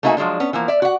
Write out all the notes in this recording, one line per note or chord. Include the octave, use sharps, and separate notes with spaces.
A3 A#3 D#4 F#4 E5 G#5
F3 F#3 G#3 D4
B3 C#4
E3 F3 A#3
D5 E5
F#4 F#5